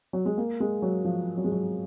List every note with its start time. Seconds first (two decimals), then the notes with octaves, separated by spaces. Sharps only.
0.13 F#3
0.26 G#3
0.38 A#3
0.60 G#3
0.82 F#3
1.05 F3
1.37 F#3
1.44 G#3
1.52 F#3